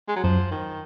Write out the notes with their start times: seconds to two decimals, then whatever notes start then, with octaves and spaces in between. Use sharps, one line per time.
0.08 G#3
0.16 F#3
0.24 F#2 F3
0.51 D#3